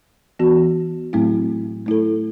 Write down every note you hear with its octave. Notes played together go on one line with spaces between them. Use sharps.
E3 B3 F#4
A2 F#3 A3 C4 E4
A3 E4 A4